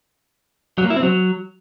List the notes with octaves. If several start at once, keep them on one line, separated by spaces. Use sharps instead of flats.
F#3
A#3
E4
C4
F#3